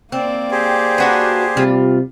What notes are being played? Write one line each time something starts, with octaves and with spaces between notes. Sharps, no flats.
A#3 C4 D5
G4 G#4 C5
D4 F#4 B4
C3 G3 F4